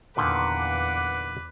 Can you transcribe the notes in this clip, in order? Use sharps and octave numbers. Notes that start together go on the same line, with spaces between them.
E2 A#2 D3 D#3 B4 F#5 D6